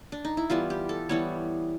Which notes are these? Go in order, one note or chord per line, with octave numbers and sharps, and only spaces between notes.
D4
D#4
E4
E3 G3 B3 F4
G4
A4
E3 G3 B3 C#5